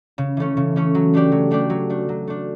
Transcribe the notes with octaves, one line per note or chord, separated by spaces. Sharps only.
C#3
E3 A3 C#4
C#3
E3 A3 C#4
F#3
A3 D4 G4 D5
F#3
A3 D4 G4 D5
F#3
A3 D4
F#3
A3 D4